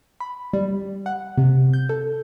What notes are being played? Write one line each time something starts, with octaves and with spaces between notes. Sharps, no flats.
B5
G3
F#5
C3
G6
A4